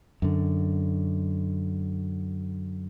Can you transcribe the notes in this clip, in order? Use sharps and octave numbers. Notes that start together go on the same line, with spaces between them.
F#2 D3